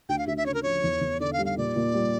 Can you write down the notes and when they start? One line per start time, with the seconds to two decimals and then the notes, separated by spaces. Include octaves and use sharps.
0.09 D2 G5
0.18 F5
0.27 D2 E5
0.37 E5
0.46 C#3 C#5
0.54 A#4
0.63 F3 C#5
0.83 E2
1.01 E2
1.20 D3 D5
1.33 F5
1.39 G3
1.45 F5
1.57 A#2 D5
1.76 A#2
1.94 G3